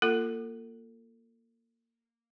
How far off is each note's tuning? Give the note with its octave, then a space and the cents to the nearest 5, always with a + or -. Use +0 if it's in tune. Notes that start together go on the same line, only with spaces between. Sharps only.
A#3 -5 F4 +0 A4 +35